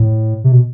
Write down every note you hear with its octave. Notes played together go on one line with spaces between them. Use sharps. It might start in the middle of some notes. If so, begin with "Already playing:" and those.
Already playing: A2
C3
B2